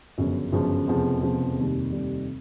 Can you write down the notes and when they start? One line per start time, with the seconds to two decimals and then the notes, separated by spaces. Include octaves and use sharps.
0.18 G1 F#2 C#3 F3
0.52 G1 F#2 C#3 F3
0.88 F1 E2 C#3 F3
1.23 F1 E2 C#3 F3
1.58 F1 D#2 D#3 G3
1.92 F1 D#2 D#3 G3